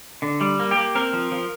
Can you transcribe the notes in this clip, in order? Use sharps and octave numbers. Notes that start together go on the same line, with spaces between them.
D3
G3
A#3
G4
A#3
C4 A#4
F3
F3